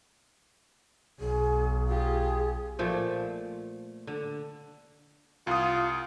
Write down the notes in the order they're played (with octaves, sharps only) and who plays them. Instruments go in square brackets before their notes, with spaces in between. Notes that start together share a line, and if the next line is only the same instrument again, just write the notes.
[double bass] B1 [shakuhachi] G#4
[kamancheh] F4 G4 [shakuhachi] G#4
[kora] A#2 F3 A3
D3
[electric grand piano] C2 D#6 [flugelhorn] F4